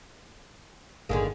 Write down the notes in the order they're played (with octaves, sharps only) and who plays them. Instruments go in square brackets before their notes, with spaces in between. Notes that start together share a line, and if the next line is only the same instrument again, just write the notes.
[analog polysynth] G1 [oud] D3 D#3 A#3 [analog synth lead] G#4